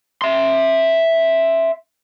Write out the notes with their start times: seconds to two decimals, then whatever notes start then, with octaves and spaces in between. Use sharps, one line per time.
0.22 E5 C6